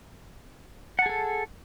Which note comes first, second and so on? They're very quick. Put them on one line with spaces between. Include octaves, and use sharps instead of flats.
F#5 A5 G#4 A4